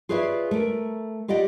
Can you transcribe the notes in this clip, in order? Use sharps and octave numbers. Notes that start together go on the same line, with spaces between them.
F4 G#4 B4 C#5 D5 E5
A3 A#4
F4 G4 D5 D#5 F#5